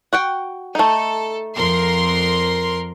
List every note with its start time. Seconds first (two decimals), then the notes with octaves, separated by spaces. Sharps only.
0.13 F#4 F#5 G5
0.75 A3 D#4 A4
1.56 F2 A#4 C6